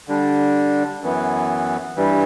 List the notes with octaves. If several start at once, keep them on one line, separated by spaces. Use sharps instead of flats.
D3 G3 D4
F#2 E3 B3
G2 E3 G3